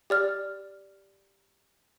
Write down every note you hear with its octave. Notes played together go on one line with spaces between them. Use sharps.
G4 D5 F6